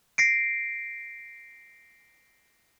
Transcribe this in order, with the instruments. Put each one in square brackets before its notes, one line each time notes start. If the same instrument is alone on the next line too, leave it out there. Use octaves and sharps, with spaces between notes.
[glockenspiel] A#6 C7 D7